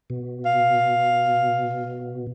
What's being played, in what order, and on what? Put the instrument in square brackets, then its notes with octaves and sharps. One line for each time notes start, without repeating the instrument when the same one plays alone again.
[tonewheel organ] B2
[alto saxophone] F5